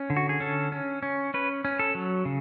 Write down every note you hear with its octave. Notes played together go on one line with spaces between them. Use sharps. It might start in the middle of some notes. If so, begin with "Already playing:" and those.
Already playing: C#4
D3
F#4
G#4
C#4 A4
C#4
C#4
C#4 B4
C#4
A4
F#3
C#3